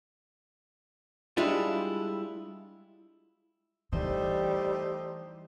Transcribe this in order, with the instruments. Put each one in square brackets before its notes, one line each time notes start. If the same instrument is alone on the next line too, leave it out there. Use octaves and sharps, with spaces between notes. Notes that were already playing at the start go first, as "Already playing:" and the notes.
[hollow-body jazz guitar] G3 G#3 D4 E4 F4
[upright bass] E3 [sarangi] G3 [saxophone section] A3 D#4 C5